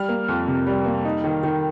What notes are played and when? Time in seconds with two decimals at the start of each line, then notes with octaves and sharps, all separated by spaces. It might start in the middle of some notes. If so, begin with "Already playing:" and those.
Already playing: G3 F6
0.09 A#3
0.28 F2
0.47 C3
0.67 G3
0.85 A#3
1.05 D#4
1.24 D#3
1.43 D#3